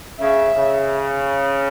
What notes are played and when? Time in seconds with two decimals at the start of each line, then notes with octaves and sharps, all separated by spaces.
0.20 C#3 E5
0.53 C#3